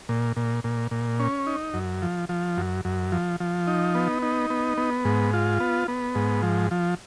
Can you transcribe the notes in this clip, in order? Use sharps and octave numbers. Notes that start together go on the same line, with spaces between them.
A#2
A#2
A#2
A#2
C#4
D#4
F#2
F3
F3
F#2
F#2
F3
F3
D#4
B3
D#4
B3
B3
G#2
F4
B3
B3
G#2
F3
F3